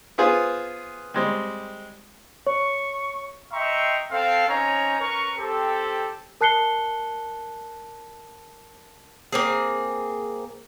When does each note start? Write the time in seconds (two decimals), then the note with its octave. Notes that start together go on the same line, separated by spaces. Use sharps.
0.18 B3 F4 G#4 C5
1.14 G3 G#3 C4
2.47 C#5 C#6
3.52 D#5 E5 G5 A#5 C6 C#6
4.12 C4 A4 F5
4.48 C4 C#4 D#4 C#5 G#5 A#5
5.00 C#4 A#4 B4 A#5 C#6
5.38 C4 G4 A4
6.41 A#4 A5 F#6 C7 C#7 G7
9.32 A#3 C4 G#4